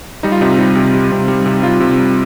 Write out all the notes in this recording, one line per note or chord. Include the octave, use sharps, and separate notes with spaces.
G3 D#4
F4
C3 D#4
G3
C3
G3
C3
G3
C3
G3 F4
C3
G3